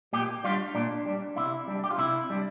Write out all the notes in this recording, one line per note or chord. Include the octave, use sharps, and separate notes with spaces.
A#2 G4
G3 D4 F4
A#2 D4
G3 D4
C3 E4
G3 D4
G4
F4
C3 E4
G3 D4